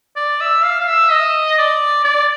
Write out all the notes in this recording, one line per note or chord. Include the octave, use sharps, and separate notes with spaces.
D5
E5
F5
F5
E5
D#5
D5
D5